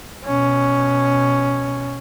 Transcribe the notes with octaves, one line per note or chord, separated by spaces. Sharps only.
B2 C#4